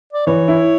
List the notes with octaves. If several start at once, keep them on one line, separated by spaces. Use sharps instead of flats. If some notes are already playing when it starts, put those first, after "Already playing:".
D5
E3 C#5
E4